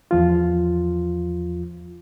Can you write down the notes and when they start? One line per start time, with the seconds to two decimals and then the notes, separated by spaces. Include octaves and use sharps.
0.11 E2 F3 F4